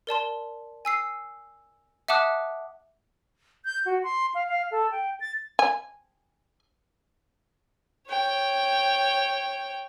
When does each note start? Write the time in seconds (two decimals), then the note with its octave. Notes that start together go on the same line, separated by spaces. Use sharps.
0.07 A#4 D5 A5 C6
0.85 G#5 E6 C7
2.08 E5 F#5 A5 D6 D#6 F#6
3.65 G6
3.86 F#4
4.03 C6
4.35 F5
4.49 F5
4.71 A4
4.91 G5
5.20 A6
5.59 G#5
8.10 C#5 G5